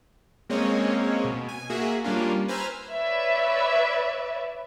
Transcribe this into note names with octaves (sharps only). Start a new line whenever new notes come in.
G#3 A#3 C4 C#4 C#5 D#5
B2
G#5
A#3 F#4 G#4 E5
G3 A#3 C#4 D4 F4
B4 C5 G#5 A#5 E6 F6
B4 C#5 D5 E5